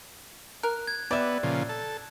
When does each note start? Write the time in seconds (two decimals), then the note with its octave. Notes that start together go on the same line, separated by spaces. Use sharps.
0.63 A#4 F#6
0.87 G#6
1.11 B3 G4 D5 E5 E6
1.43 A#2 C#3 F3
1.69 A4